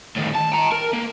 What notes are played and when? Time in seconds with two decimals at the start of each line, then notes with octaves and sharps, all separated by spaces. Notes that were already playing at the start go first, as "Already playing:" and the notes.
0.16 A2 D#3
0.35 A5
0.52 G5 A#5
0.72 A#4
0.93 A#3